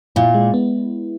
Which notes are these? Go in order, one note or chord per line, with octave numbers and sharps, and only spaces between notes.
A#2 E4
G#3
B3